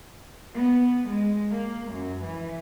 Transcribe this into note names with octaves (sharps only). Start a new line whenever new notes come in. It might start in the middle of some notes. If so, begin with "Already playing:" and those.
B3
G#3
A#3
F#2
E3